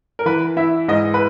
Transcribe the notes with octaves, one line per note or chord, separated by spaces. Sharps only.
A#4
E3 B4
E4 E5
G#2 D#5
B4